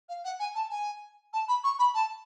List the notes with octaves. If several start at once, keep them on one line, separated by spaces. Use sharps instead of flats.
F5
F#5
G#5
A5
G#5
A5
B5
C#6
B5
A5